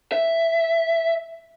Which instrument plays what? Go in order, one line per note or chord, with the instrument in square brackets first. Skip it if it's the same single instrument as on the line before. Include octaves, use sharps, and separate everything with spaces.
[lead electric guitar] E5